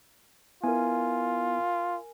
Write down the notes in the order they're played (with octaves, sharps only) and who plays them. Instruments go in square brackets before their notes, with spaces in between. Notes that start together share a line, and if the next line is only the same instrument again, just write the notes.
[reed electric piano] B3 E4 [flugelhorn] F4 [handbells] A#4 G#5